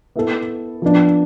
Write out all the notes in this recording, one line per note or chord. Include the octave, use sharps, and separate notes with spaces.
B3 E4 A4
F3 B3 D4